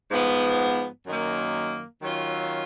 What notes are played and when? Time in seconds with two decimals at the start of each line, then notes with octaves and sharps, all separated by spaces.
0.11 G#2 F3 B3
1.07 F#2 D#3 A#3
2.02 D#3 F#3 C#4 F4